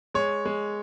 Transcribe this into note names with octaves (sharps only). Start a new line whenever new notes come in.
G#3 C#5
G#3